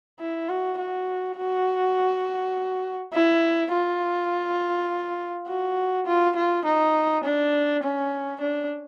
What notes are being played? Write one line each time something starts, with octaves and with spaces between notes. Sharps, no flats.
E4
F#4
F#4
F#4
E4
F4
F#4
F4
F4
D#4
D4
C#4
D4